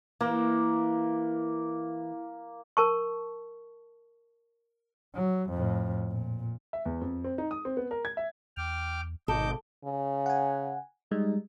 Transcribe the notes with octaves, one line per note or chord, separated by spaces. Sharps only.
E3 A#3
A#4 A5 C#6
F#3
F2 A2
A#2
E5
E2
F2
C4
D#4
D#6
C4
B3
A#4
G#6
E5
E2 G5 D6 F6
G#1 B2 A4 D#5 D6 G6
C#3
F#5 G#5
G3 G#3 D#4